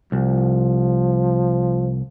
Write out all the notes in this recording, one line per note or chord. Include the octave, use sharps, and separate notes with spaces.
C2 F3